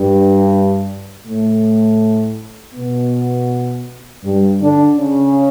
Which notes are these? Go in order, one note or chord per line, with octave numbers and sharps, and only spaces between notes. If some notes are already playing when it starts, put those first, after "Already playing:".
Already playing: G2 G3
A2 A3
B2 B3
G2 G3
D3 D4
C#3 C#4